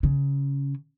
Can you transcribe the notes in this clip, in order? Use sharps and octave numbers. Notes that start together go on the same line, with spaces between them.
C#3